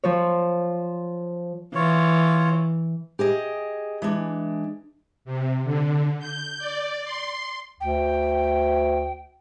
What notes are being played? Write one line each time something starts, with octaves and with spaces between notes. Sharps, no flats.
F3 C#5
E3 F4 C#5
G4 G#4 D#5
E3 G#3 D4
C3
D3
G6
D5
C6
D2 G5